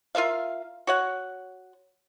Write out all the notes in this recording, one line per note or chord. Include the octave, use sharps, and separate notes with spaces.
F4 A#4 E5 F5
F#4 C#5 F#5